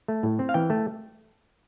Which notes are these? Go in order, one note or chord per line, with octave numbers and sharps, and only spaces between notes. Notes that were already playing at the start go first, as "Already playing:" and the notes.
A3
A2
C4
F5
E3 G5
A3